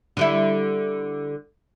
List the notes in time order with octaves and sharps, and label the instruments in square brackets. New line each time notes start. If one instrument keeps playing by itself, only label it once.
[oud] D3 G3 E4